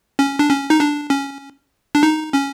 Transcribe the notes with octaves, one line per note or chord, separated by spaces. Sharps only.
C#4
D4
C#4
D#4
D4
C#4
D4
D#4
C#4